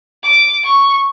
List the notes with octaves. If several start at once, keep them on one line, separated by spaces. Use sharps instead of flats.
D6
C#6